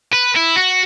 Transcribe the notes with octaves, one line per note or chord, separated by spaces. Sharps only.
B4
E4
F#4